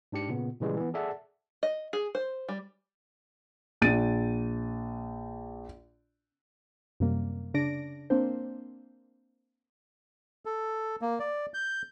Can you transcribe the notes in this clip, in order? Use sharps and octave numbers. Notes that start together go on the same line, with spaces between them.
G#2 D4 G4 C#7
A#2 C#3 B3
A#2 C#3 E3 G3 G#3
E3 B3
G#4 A4 D5 E5 F#5 A5
D#5
G#4
C5
G3
A#1 A6 D#7
F#2 C3 G3 A#3
C#3 D4 D5 A#6 D7
A#3 C4 D4 C5
A4
A#3
D5
G6